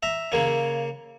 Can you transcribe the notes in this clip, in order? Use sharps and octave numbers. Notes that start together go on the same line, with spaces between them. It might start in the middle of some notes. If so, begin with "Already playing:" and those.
E5 A#5
C#3 A#3 C#4